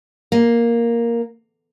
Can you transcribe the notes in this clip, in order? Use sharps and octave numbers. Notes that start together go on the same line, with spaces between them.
A#3